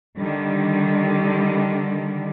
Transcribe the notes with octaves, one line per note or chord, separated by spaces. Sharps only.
D3 D#3 G3